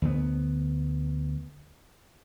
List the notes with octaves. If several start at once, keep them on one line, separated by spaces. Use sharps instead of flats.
D2 B3